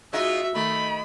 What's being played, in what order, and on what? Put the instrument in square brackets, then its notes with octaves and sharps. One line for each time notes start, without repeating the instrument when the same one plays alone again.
[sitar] G#3 D#4 F4 [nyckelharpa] F#4 E5
[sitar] D#3 [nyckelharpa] A3 [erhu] B5